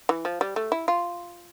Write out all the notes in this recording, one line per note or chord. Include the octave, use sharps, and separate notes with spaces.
E3
F3
G3
A3
E4
F4